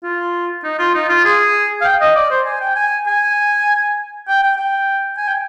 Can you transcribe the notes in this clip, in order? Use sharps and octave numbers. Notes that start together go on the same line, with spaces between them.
F4
D#4
F4
D#4
F4
G#4
F5
G5
D#5
D5
C5
G#5
G5
G#5
G#5
G5
G5
G5
G#5
G5